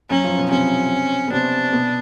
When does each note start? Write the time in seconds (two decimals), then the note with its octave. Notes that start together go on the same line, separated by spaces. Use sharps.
0.10 F#2 F#3 C#4
0.24 F3
0.37 B2 B3
0.50 C3 C4 C#4
1.28 B3
1.32 C3 C4 D4
1.72 B2 B3